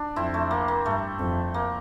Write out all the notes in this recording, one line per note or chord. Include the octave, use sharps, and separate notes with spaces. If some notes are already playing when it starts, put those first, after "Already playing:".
Already playing: D4
F2 C4 E4
A3
A#3
A#3
G2 A3
F2
A#3